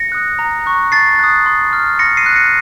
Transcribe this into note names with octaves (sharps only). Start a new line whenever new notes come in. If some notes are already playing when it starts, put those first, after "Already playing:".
Already playing: A#6 C#7
D#6 F#6
A#5
C#6 F#6
A5 A6 C7
D#6 F#6
C6
F6
C6 A#6 C#7
C7 D#7
F#6
A#6 C#7